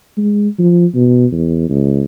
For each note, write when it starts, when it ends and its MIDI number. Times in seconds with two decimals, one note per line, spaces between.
0.17 0.48 56
0.59 0.86 53
0.95 1.26 47
1.32 1.69 40
1.69 2.04 37